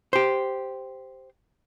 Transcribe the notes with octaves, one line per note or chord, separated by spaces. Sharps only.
G4 C5